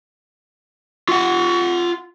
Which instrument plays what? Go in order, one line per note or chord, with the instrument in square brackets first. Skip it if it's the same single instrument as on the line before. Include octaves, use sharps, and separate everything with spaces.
[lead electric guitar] F4 F#5